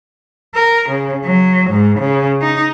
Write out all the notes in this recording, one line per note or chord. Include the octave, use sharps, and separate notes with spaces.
A#4
C#3
F#3
G#2
C#3
D#4